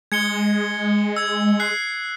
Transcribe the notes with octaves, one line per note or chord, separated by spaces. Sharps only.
G#3 G#6 C#7 G7
E6 G#6
F#6 C7